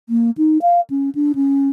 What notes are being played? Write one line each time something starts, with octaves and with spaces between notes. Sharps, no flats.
A#3
D#4
F5
C#4
D4
C#4